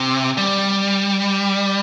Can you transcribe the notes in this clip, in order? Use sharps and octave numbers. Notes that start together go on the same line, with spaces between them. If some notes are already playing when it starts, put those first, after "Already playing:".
Already playing: C3
G3